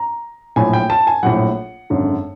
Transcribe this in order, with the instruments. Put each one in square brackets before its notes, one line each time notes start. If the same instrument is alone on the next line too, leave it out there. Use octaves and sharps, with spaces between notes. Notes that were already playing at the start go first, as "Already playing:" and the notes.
Already playing: [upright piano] A#5
A#1 A2 F#3 G#5
G5
A5
G#5
A#1 A2 F#3 F#5
G#1 F#2 D3